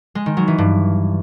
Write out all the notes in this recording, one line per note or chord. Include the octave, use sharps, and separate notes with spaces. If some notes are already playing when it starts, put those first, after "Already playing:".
G#3
D#3
F#3
E3
G2